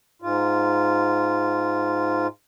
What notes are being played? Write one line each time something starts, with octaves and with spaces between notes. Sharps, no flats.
G#2 F4